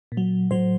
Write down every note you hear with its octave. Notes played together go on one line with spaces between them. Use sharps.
A#2
F#3
A2 F#3 C5